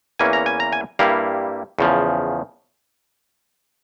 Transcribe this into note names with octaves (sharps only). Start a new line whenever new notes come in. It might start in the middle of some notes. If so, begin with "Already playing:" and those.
E2 E3 A#3 C#4 G#5
A#5
G#5
A#5
G#5
G2 G3 A#3 E4 F5
E2 C#3 F3